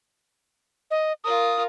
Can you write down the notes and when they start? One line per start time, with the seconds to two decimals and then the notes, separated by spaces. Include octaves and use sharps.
0.91 D#5
1.24 F4 A#4 D#6